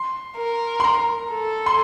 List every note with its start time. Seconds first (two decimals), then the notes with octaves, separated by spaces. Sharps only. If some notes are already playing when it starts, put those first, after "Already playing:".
Already playing: C6
0.36 A#4
0.80 C6
0.84 A#5
1.31 A4
1.66 C6